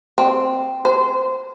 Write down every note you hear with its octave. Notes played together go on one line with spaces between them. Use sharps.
C4
C5